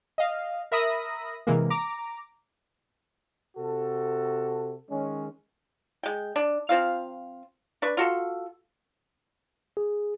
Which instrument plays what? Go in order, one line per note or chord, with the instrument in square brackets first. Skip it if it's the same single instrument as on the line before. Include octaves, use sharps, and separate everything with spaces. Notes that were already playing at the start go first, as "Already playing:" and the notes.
[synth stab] D#5 F5
A#4 E5 B5 D#6 A#6
C3 E3 G#3 A#3
A#5 D6
[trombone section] C3 F#4 A4
D#3 G#3 C#4
[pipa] G#3 G5
D4
F3 C4 F4 F5
D4 B4 C#6
F4 F#4 A4
[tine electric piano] G#4